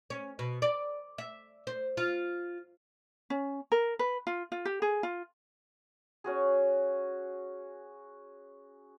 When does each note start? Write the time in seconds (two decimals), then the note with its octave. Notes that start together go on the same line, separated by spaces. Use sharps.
0.10 C#4
0.39 B2
0.62 D5
1.18 E5
1.67 C5
1.97 F4
3.30 C#4
3.72 A#4
3.99 B4
4.27 F4
4.52 F4
4.65 G4
4.82 G#4
5.03 F4
6.24 C#4 F#4 G#4